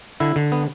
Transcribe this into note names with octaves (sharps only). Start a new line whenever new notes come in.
D3 E4
D3
B3